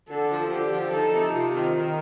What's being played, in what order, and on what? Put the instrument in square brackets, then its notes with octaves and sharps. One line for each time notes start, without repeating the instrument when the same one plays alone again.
[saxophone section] D3 [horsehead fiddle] A4
[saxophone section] F3
[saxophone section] D3 [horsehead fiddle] G4
[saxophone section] F3
[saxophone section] D#4 [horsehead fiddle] A4
[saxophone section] C3
[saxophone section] C3 [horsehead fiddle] F4
[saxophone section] D#3
D#3